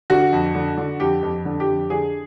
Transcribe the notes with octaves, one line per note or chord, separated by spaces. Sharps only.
D3 F#4
F2
D3
D3
F2 G4
F2
D3
G4
F2
D3 G#4